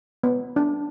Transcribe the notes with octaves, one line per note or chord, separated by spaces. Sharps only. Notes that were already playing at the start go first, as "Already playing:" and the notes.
B3
D4